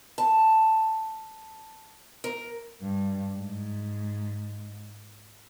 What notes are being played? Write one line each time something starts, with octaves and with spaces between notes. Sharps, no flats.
A5
A#4
G2
G#2